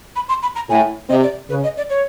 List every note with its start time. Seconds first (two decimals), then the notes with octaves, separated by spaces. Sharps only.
0.16 B5
0.29 C6
0.42 B5
0.55 A#5
0.69 A2 G#5
1.09 C3 D#5
1.23 D5
1.49 C#3 B4
1.63 D#5
1.77 D5
1.90 C#5